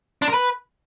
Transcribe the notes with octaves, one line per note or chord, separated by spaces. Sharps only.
D4
A#4
B4